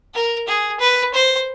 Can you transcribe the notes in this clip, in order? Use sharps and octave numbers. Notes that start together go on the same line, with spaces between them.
A#4
G#4
B4
C5